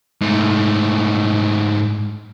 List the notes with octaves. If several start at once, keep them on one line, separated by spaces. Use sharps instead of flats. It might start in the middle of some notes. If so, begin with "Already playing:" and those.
G#2 A3